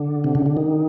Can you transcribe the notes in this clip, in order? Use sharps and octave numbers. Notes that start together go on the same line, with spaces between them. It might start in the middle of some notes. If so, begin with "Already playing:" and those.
Already playing: D3
C3
C#3
D3
D#3